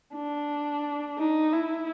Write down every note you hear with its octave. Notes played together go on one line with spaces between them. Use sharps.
D4
D#4
E4